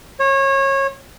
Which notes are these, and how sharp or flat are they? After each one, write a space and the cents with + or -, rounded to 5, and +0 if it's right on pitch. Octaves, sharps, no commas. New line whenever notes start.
C#5 -25